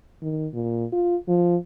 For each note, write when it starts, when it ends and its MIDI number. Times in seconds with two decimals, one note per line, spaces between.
0.22 0.47 51
0.54 0.85 46
0.93 1.16 65
1.28 1.56 53